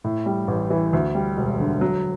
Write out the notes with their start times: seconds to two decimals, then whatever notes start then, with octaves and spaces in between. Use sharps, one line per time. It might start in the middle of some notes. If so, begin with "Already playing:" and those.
0.04 A2
0.26 G3
0.48 A1
0.70 E3
0.93 D2
1.15 G3
1.37 E1
1.59 D3
1.81 F#3